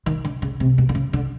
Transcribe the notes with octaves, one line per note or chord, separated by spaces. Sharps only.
D#3
D3
C#3
C3
B2
D3
C#3
D3